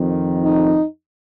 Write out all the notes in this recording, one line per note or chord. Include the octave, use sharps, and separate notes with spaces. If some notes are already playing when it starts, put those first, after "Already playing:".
Already playing: F2 D#3
D#4